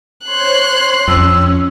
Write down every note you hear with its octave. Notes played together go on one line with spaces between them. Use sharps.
C5 C#5 C6 F#6
F2 C#4 E6